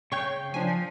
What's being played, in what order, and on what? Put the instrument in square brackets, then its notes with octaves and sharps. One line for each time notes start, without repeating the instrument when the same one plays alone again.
[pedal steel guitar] C#3 G5 G6 [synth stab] C#5 C#6
[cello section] F3 [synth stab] D4 G#5